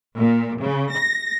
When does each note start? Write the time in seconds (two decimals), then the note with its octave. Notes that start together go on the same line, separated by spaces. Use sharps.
0.16 A#2
0.61 C#3
0.92 A#6